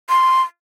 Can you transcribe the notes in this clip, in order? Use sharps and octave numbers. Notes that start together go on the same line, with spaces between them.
C6